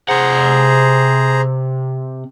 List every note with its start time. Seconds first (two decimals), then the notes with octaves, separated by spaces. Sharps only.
0.09 C3 G#4 C5 F#5 A#5